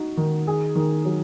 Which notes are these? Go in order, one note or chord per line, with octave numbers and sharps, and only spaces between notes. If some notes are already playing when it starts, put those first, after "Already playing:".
Already playing: D#4 F#4
D#3
G#4
D#3
F#3